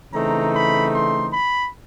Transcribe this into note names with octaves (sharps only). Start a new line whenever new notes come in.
C#3 E3 A3 C4 D#4 A#5
B5
C6
B5